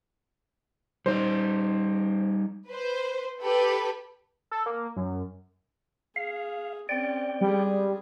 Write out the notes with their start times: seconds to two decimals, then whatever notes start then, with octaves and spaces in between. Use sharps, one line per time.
1.06 G3 D#4 C5
2.67 B4 C5
3.42 G4 A4 B4 B5
4.51 A4
4.66 A#3
4.97 F#2
6.16 G#4 F5
6.89 C4 C#4 D5 G5
7.41 G3 G#3 G#4